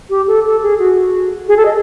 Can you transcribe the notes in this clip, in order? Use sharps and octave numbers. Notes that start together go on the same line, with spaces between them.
G4
A4
A4
G#4
F#4
G#4
A4
D#5